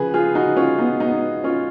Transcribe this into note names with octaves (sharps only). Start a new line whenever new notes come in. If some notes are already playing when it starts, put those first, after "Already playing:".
Already playing: C#3 F3 G#4 B4
F4 G#4
D#4 F#4
C#4 F4
B3 D#4
B3 D#4
C#4 F4